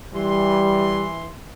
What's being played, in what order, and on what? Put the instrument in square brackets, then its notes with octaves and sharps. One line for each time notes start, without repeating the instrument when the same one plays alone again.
[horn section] E3 C6 [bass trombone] G3